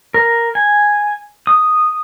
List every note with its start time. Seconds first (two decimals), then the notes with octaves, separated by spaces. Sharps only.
0.14 A#4
0.55 G#5
1.47 D#6